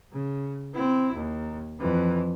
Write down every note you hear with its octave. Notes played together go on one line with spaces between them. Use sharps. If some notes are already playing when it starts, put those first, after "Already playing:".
C#3
C4 E4
D#2
F2 E3